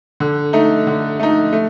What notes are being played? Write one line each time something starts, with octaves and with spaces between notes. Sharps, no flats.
D3
A3 D#4
D3
A3 D#4
A3